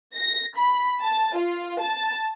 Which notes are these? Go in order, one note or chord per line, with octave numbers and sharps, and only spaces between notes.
A#6
B5
A5
F4
A5